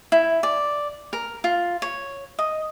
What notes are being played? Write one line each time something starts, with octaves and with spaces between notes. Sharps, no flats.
E4
D5
A#4
F4
C#5
D#5